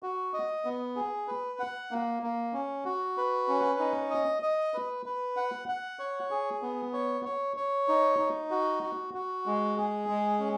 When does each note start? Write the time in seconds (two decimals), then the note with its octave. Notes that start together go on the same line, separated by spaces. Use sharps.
0.03 F#4
0.34 D#5
0.65 B3
0.96 G#4
1.28 B4
1.59 F#5
1.91 A#3
2.23 A#3
2.53 C#4
2.85 F#4
3.17 B4
3.48 C#4
3.79 D#4
4.10 D#5
4.43 D#5
4.74 B4
5.06 B4
5.37 F#5
5.68 F#5
5.99 C#5
6.31 G#4
6.62 B3
6.93 C#5
7.25 C#5
7.57 C#5
7.88 D#4
8.19 D#4
8.51 F#4
8.83 F#4
9.14 F#4
9.46 G#3
9.77 G#4
10.09 G#3
10.40 C#4